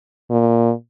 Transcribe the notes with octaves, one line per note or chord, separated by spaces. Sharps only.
A#2